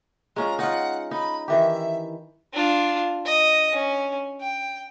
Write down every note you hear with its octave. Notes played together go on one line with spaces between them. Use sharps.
G#3 C#4 F4 A#5
D#4 F4 F#5
D#4 B5
D#3 E3 G4 E5
D4 F4
D#5
C#4
G5